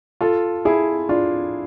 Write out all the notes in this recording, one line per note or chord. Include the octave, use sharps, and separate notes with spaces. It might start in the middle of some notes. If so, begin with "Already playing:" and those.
F4 A4
E4 G#4
D4 F4